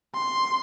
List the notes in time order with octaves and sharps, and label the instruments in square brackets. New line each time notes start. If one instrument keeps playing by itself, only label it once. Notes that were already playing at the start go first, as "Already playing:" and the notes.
[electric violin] C6